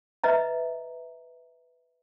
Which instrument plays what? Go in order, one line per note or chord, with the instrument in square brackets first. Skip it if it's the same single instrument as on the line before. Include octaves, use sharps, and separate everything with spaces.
[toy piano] B4 D#5 E5 A#5